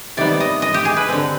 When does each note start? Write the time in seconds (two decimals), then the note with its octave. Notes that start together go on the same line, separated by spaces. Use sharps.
0.17 C3 D#3 G3 B3 D5
0.40 D#5
0.62 D#5
0.74 G4
0.85 G#4
0.97 B4
1.08 D3 G3 C4